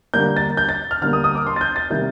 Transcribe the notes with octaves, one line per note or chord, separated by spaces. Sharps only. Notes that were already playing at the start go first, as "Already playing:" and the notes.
D3 G3 A#3 G6
A6
G6
A6
F6
D3 G3 A#3 F6
D#6
D#6
D6
C6
A6
G6
A6
C3 D#3 G3 A#3 G6